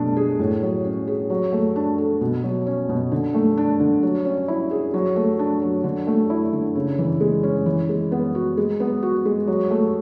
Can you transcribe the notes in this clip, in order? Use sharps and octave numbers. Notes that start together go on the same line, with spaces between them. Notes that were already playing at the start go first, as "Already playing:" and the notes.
Already playing: B2 A3 D4
G#4
A2
F#3
C#4
G#4
F#3
A3
D4
A4
B2
F#3
C#4
B2
D3
A3
D4
D3
F#3
C#4
E4
G#4
F#3
A3
D4
F#3
D3
A3
E4
D3
C#3
E3
G#3
C#4
E3
G#3
B3
F#4
G#3
B3
F#4
G#3
F#3
A3